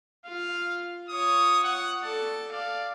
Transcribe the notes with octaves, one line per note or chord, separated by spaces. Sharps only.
F4 F5
F4 C#5 D#6
F#5
A4 D5 A5
D5 F5